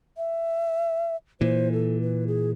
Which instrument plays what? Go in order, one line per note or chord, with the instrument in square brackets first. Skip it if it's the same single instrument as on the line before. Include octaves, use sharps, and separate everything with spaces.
[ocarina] E5
[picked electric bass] A#2 E3 [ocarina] C5
[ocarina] A4
B4
G#4